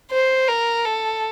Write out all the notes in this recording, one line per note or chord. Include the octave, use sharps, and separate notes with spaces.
C5
A#4
A4